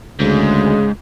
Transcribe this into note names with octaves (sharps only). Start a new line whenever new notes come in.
D2 G#2 C#3 G#3